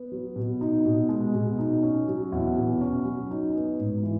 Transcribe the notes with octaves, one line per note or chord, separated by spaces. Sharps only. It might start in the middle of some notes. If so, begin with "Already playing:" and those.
Already playing: B3
F#3
B2
D#4
B2
G#3
B2
D#4
C#4
F#3
E2
B2
C#4
F#3
D#4
B3
G#2
E3